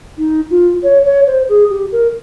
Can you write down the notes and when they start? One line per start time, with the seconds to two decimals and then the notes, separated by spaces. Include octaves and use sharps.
0.18 D#4
0.50 F4
0.83 C#5
1.05 C#5
1.27 C5
1.49 G#4
1.70 G4
1.92 A#4